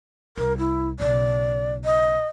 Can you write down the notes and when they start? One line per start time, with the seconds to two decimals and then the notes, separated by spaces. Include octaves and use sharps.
0.37 C2 A#4
0.58 E4
1.00 B1 C#3 D5
1.85 D#5